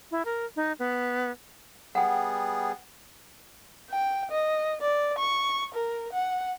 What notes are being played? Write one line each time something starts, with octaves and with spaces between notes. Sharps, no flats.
E4
A#4
D#4
B3
G3 B3 G#4 F#5 G5
G5
D#5
D5
C#6
A#4
F#5